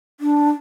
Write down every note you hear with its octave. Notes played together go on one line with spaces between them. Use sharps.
D4